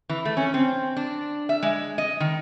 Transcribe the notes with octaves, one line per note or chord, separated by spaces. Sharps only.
E3
A3
C#4
C4
D4
E5
G#3
D#5
D#3